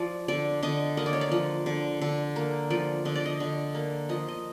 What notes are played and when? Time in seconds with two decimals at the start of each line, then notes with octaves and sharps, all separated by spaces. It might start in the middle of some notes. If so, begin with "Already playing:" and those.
Already playing: F3 D5
0.28 D3 D5
0.63 D3 D#5
0.97 A#3 D#5
1.06 D5
1.13 C#5
1.21 D5
1.32 F3
1.66 D3
2.01 D3
2.36 A#3
2.71 F3 D5
3.05 D3 D#5
3.16 D5
3.26 D#5
3.40 D3
3.75 A#3
4.09 F3 D#5
4.28 D#5